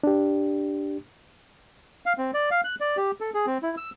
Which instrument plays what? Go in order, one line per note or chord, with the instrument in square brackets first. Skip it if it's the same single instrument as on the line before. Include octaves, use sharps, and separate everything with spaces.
[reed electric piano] D4 G4
[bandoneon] F5
C4
D5
F5
F#6
D5
G4
A4
G#4
C4
E4
E6